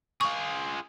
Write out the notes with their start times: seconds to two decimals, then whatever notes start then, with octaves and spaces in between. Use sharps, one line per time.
0.21 F4 G#4 C#6